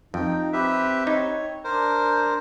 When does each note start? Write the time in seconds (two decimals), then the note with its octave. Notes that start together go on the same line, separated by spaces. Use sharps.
0.14 F2 D#4 G5
0.53 C4 G4 B4 E5
1.07 D#4 C#5
1.64 D4 A#4 C5